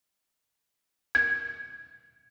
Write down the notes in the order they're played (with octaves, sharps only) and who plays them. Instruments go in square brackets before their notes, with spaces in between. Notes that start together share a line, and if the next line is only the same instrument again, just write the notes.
[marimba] G#6